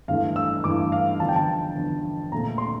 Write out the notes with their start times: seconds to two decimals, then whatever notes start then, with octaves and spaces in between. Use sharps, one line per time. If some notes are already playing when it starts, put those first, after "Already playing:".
0.08 G2 E3 A3 F5
0.36 E6
0.64 G2 E3 A3 D6
0.92 F5
1.20 E2 D3 F3 A5
1.29 G5
1.36 A5
1.76 E2 D3 F3
2.32 A#2 A3 C4 A#5
2.58 C6